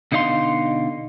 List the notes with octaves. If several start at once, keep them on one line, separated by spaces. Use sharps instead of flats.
B2 D3 D#4 D#5 F5 C6